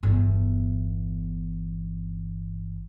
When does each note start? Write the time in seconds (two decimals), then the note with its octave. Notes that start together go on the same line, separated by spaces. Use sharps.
0.03 G1 E2